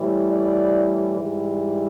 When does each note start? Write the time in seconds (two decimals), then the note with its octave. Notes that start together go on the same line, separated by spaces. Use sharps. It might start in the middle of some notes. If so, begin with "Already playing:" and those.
Already playing: A2 E3 G3
0.30 D5
1.15 G#2 E3 G3